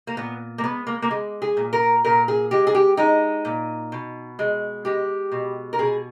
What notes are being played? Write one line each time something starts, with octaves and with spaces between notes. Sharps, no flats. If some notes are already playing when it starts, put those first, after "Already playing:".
A#3
A#2 B3
A#3
G#3 B3
A#3
A#3
G#3
G#4
A#2
A#4
A#2 A#4
G#4
G#3 G4
G#4
G4
G#3 D#4
A#2
B2
G#3
G#3 G4
B2
A#4
B2 G#4